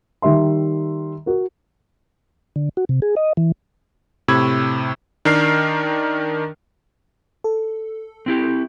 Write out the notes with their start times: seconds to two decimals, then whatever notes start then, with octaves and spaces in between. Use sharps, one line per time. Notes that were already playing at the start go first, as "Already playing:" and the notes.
0.22 D#3 G3 E5 C6
1.26 F#4 A#4
2.56 D3
2.77 F#4
2.89 C3
3.02 G#4
3.17 D#5
3.37 E3
4.28 A2 C3 B5 C#6 E6 G#6
5.25 D#3 D4 A#4 F6 C7
7.44 A4
8.26 C4 E4 G4